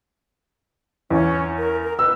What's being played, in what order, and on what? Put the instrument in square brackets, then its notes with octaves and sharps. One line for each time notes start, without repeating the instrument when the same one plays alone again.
[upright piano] E2 [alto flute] C#4
[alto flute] A#4
A#4
[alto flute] B4 [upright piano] E6